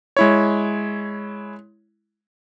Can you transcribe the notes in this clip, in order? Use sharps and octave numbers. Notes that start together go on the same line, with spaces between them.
G#3 E4 C#5